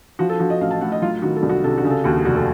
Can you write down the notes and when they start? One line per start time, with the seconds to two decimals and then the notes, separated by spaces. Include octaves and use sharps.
0.19 F3 F#4
0.29 A4
0.40 F3 F#4
0.50 D#5
0.61 A1 F5
0.71 A5
0.81 A2 F#5
0.92 D#5
1.02 F#3 F4
1.22 D#3 F#4
1.36 A4
1.43 C2
1.49 F#4
1.64 C3 A4
1.78 F#4
1.84 C#3
1.90 A4
2.04 D#2 F#4
2.25 F1 F#4
2.36 A4